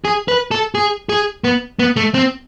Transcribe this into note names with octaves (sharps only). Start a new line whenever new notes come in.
G#4
B4
A4
G#4
G#4
B3
B3
A3
C4